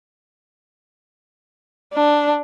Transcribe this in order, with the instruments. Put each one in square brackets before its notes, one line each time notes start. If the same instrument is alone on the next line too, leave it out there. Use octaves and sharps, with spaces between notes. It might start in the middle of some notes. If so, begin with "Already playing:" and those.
[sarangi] D4